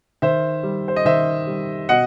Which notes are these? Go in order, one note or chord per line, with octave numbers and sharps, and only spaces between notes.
D#3 C5 E5
G3
C5
D#5
D#3 C5 E5
G3
B2 D#5 F#5